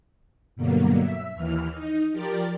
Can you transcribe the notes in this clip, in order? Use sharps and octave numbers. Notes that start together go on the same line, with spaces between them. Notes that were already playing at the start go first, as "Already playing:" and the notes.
G2 B2 D3 F#3 A#3
E5
D#2 E3 F6
D#4
F3 G4 A#4 D5 A6